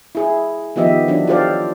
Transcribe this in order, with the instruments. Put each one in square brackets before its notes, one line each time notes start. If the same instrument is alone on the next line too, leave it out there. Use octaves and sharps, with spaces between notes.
[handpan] E4 G#4
D#3 F3 B3 G4 D#5 E5
E3 F#3 D4
F4 G4 A4 C5 D5 F5